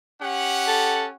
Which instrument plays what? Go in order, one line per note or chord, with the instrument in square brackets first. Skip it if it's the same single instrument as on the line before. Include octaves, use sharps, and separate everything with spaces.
[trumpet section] C#4 G4 F#5
[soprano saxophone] A4